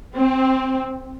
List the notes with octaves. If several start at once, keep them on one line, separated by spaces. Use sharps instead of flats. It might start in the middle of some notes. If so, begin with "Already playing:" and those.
C4